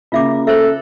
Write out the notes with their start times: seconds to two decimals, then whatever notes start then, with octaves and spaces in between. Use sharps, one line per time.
0.12 C#3 A#3 F4 E5 D6
0.47 A4 C5 E5